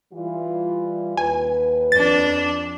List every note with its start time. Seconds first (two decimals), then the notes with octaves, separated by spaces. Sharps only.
0.14 E3 G3 F4
1.17 D#2 B4 G#5
1.92 F2 D4 A6